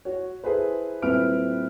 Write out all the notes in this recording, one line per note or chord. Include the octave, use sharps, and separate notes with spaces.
F#4 C#5
E4 G#4 A4 B4 C5
D#1 C4 E4 B4 F6 D7